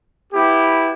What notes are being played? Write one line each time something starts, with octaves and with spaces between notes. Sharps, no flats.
B3 E4 G4